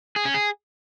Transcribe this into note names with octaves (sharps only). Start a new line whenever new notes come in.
G#4
C#4
G#4